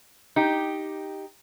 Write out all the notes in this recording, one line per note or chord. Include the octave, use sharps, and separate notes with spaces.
D#4 G4